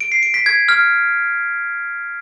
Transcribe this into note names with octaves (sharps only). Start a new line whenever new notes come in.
D7
C7
D7
B6
G#6
F6